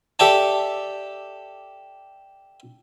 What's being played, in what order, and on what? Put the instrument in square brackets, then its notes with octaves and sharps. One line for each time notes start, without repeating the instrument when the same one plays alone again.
[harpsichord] G4 A4 D5 E5 A5